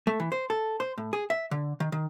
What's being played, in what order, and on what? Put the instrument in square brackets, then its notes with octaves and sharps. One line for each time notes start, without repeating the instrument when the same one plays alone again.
[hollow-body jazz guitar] A3
E3
C5
A4
C5
A2
G#4
E5
D3
D#3
D#3